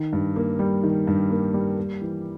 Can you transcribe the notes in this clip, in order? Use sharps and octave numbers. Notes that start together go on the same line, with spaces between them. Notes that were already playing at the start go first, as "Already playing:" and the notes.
Already playing: D#3
G2
A#3
G3
D#3
G2
A#3
G3
A#3
E3